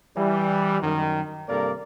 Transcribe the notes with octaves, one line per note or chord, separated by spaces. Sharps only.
E3 G3
F#2 D#3
G2 C3 A#3 A4 A#4 D5